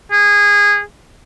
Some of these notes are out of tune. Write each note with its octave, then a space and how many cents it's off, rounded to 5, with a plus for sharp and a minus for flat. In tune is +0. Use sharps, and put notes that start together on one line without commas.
G#4 -20